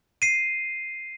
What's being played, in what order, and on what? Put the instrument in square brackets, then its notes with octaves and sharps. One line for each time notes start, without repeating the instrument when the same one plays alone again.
[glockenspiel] C7 D#7